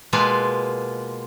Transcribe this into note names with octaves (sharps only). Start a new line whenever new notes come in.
B2 G#3 A#3 F4 B4